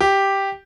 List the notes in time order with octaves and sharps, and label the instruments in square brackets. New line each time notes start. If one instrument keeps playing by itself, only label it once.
[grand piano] G4